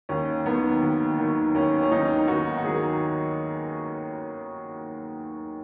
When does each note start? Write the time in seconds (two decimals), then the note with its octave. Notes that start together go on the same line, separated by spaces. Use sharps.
0.09 D#2 C#4
0.46 D#3 F#3 B3
0.83 D#2
1.19 D#3 F#3
1.55 D#2 C#4
1.83 C#4
1.92 D#3 F#3 D#4
2.28 D#2 F#4
2.58 F#4
2.64 D#3 F#3 G#4